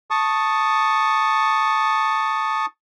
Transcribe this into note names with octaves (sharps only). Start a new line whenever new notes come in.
A5 C#6 D#6